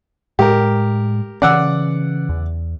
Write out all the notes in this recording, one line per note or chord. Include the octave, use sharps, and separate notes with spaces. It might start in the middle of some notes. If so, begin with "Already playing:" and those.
A2 G#3 G4 A#4
C#3 E3 C#4 D5 F#5 E6
E2